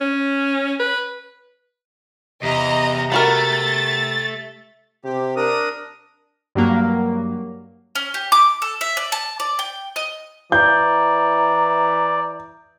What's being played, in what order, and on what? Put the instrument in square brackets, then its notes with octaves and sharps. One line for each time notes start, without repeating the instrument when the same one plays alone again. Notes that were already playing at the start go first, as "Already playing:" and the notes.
[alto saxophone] C#4
B4
[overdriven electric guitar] E2 [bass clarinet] C3 [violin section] D#5 A#5
[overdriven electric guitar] A3 [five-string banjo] B3 F#4 A#4 [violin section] A6
[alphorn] C3 [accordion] G4
[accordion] D4 A#4 D#6
[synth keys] G2 F#3 A#3
[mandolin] C#4
G4
D6
A4
E5
D5
A5
D5
G5
D#5
[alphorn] E3 [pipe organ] D5 [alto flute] A#5 [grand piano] G6